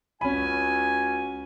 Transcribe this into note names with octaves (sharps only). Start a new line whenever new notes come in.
C#2 C#4 F#4 G#5 B5